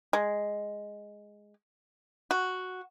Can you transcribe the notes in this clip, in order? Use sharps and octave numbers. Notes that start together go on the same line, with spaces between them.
G#3
F#4